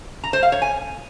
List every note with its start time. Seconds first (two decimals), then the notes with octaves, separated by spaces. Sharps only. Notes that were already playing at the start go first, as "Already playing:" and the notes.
0.24 A#5
0.33 C5
0.43 F5
0.52 C#5
0.62 G#5